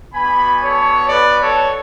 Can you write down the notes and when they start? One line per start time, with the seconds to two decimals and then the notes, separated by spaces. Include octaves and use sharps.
0.14 B3 D4 F#4 G#5 B5
0.61 A4 C#5
1.08 B4 D5
1.40 A4 C#5